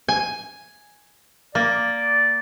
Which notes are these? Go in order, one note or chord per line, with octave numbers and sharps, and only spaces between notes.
G#5
A#3 D5